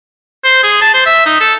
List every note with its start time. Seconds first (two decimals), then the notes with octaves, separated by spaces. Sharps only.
0.44 C5
0.63 G#4
0.82 A5
0.94 C5
1.06 E5
1.26 D#4
1.41 A4